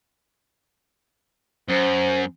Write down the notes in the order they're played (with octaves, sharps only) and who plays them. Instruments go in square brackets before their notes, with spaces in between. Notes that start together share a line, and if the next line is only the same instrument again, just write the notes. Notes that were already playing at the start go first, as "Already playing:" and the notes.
[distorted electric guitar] F#2 [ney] C5